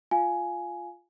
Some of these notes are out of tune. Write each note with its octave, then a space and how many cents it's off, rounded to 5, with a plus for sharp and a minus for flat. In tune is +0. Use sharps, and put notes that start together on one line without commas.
F4 +0 F5 +0 G#5 +10